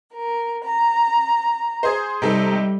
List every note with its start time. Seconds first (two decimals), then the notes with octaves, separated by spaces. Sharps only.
0.13 A#4
0.64 A#5
1.83 G#4 C5
2.22 C3 G3 D#4 A4